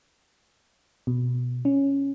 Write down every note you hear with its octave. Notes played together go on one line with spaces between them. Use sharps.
B2
C#4